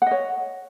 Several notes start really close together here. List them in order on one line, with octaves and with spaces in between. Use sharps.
F#5 D#5 C#5